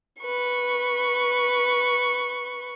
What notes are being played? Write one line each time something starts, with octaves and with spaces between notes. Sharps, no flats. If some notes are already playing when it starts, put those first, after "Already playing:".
B4 C#6